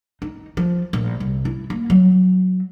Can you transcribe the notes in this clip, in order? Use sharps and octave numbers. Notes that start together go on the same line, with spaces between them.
D#4
F3
A#1
C2
E4
A#3
F#3